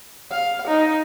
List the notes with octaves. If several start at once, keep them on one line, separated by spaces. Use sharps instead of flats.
F5
D#4